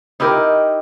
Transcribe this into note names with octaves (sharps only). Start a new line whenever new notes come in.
D#4 E4 G4 A#4